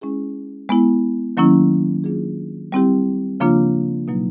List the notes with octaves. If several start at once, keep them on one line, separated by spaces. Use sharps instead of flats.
G#3 C#4 E4 G#4
G#3 B3 E4
D#3 F#3 A#3 C#4 E4
F#3 A#3 D4 F4 G#4
G3 C4 E4 G4
C#3 F3 A#3 D4 F4
B2 F#3 A#3 D#4